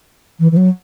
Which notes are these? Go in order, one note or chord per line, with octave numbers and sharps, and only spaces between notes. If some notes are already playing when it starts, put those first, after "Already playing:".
E3
E3
F#3